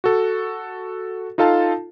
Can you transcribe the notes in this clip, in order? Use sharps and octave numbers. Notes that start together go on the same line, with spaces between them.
F#4 A4
D#4 F4 A4 F5 A5